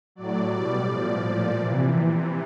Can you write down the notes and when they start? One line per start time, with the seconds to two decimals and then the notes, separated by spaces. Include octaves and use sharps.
0.15 A2 F#3 D5
0.51 B2 G3 D5
0.87 A2 F3 D5
1.23 A#2 F3
1.59 C3 E3